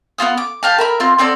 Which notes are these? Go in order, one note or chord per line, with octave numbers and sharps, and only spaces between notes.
B3 D#4 F4 D#6
D6
G4 F5 A5
A#4 E5 B5
C4 F4
B3 C4 A4 D5